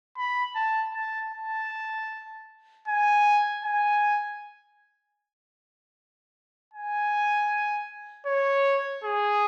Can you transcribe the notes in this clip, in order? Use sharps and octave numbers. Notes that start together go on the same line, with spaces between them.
B5
A5
A5
A5
G#5
G#5
G#5
C#5
G#4